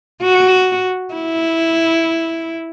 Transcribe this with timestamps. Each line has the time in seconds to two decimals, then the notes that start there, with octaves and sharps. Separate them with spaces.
0.24 F#4
1.15 E4